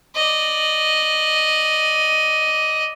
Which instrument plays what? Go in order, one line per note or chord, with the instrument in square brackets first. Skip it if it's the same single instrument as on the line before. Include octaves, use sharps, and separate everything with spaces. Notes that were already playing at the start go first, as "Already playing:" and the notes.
[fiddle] D5 D#5